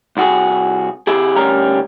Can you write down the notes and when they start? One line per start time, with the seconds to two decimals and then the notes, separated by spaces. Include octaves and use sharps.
0.17 C2 F#4 G#4
1.07 C3 E4 G4 G#4
1.36 D2 G3 C#4 A#4 A#5